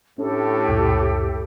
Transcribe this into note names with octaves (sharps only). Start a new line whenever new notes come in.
A2 C#4 D4 G4 A4
C#2 F#2 A#2